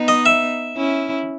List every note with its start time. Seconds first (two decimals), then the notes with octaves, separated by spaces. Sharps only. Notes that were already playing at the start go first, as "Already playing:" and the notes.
Already playing: B3 D#4
0.08 D#5
0.26 E5
0.76 C#4 E4